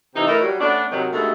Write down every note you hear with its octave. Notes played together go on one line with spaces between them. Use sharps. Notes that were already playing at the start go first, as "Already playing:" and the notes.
C3 E3 D#4
E3 A3 D#4 A#4 B4 E5
F#3 G3
A3 B3 C#4 D4
C3 D#3 F#3
G2 B2 D#3 G#3 A3